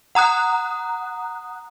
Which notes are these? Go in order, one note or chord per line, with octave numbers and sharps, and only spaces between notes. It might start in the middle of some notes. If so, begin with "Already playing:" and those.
F#5 A#5 D#6 F#6